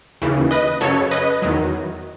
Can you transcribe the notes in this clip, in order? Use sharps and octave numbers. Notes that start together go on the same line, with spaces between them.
D#2 C#3 E3
B4 D#5
F#2 C#3 F#3 A4 C#5
B4 D#5
E2 D#3 F#3